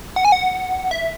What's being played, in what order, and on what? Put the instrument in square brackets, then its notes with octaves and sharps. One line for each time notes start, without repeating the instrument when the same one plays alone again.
[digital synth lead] F#5
G#5
F#5
E5